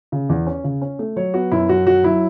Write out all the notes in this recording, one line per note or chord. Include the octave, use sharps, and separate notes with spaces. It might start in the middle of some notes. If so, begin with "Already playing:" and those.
C#3
E2
C#4
C#3
C#4
A3
F#3 C#5
B3 F#4
F#2 E4
F#2 F#4
F#3 F#4
F#3 E4